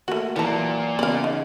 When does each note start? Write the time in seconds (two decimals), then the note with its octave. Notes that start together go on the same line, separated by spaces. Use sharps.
0.08 A3 A#3 F#4 C#5
0.36 A#2 E3 F#3 A#3 B4 A5 A#5
0.99 C#3 B3 G#4 D5 F5
1.24 D#4